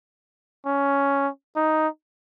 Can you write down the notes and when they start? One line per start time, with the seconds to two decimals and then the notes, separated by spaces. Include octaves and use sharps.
0.66 C#4
1.56 D#4